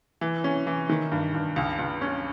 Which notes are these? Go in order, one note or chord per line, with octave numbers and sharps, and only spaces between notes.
E3
C#4
E3
D#3
G2
G2
C#2
C#2
C#4